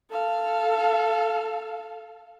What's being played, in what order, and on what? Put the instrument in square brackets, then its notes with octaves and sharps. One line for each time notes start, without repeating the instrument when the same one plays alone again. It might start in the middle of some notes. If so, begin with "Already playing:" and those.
[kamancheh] A4 F5